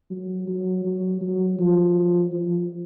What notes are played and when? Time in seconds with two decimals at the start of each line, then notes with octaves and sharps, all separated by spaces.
0.11 F#3
0.47 F#3
0.85 F#3
1.21 F#3
1.59 F3
2.33 F3